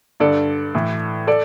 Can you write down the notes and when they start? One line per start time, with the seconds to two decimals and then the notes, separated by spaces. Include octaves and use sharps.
0.20 G2 D3 A4 D5
0.75 A2 E3
1.27 A4 D5